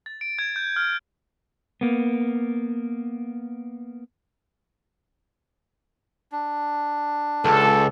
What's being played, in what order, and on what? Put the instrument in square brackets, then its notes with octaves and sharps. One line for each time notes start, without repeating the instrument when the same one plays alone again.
[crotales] A6
D7
G#6
G6
F6
[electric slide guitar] A#3 B3
[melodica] D4
[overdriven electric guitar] C#2 [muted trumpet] A4